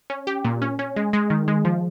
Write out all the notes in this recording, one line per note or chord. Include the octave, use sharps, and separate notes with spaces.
C#4
G4
A#2
C#4
C#4
G#3
G#3
D#3
G#3
F3